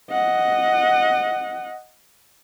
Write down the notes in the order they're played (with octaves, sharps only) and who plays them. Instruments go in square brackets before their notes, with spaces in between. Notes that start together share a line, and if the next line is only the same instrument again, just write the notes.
[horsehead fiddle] D#5 F#5